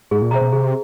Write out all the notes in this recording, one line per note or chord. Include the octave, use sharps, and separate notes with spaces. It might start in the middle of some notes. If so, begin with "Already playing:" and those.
G#2 G#4
A#2
B2 C5 E5 G5 A#5
B2
C3 G#4